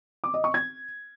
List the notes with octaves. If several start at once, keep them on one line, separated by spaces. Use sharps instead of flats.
D6
D#5
C#6
G#6